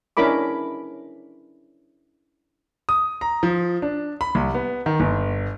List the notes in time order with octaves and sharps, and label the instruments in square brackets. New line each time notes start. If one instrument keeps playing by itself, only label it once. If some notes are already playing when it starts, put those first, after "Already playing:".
[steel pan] C#4 D4 E4 A#4 B5 D6
[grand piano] D#6
A#5
F3
D4
B5
C2
B3
D#3
G1